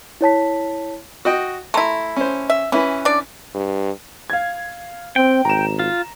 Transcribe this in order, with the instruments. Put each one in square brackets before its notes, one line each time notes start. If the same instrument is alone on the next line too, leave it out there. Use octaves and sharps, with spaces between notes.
[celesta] E4 C#5 A5 B6
[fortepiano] F#4 D#5 G5
[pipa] A3 E4 [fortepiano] A#5 C6
[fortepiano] C#4 C5
[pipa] E5
[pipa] E3 [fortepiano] C#4 E4 B4
[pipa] D4 D5
[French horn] G2
[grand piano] F5 G#6
[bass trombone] C4 [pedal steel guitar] G5
[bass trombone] G#1 [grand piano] A#5 E7
[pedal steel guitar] F4